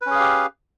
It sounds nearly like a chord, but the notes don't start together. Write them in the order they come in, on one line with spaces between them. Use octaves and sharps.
B4 C#4 G#4 F5 G4